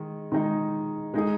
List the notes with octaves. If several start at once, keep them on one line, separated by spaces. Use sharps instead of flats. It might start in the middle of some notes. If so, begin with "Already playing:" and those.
Already playing: D#3 G#3 D#4 G#4
D#3 G#3 D#4 G#4
G#3 D#4 G#4